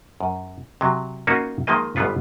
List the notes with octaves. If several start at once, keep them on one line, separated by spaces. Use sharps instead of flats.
F#2
C3 F#3
A#3 C#4 D#4 F4 F#4
D#3 F3 G#3 A#3 D#5
G1 G#2 G3 B3 F4 B4